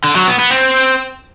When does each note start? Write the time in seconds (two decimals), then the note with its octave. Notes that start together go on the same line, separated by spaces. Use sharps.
0.04 D3
0.15 F#3
0.27 B3
0.39 B3
0.51 C4